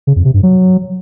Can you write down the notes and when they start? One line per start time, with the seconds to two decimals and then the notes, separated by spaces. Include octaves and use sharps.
0.07 C#3
0.16 F2
0.25 C3
0.34 G2
0.43 F#3